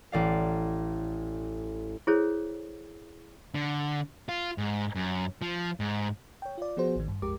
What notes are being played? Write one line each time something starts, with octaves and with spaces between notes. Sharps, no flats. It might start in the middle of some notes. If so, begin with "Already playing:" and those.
A1 D5 F5
E4 G#4 A4 C5 C#5
D3
F4
G#2
F#2
F3
G#2
C#5 G5
F4 D5
F3 B3 F#4 G#4 C5
A1 D#3
G2
A#1 F2 G#3 G4 A#4 D6